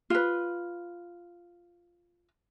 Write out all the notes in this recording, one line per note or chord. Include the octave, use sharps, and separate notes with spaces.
F4 B4